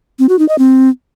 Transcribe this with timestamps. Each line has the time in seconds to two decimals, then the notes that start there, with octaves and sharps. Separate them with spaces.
0.19 C4
0.29 F#4
0.39 D#4
0.49 D#5
0.58 C4